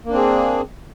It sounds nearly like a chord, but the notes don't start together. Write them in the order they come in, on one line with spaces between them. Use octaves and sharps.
A#3 D4 C4 G#4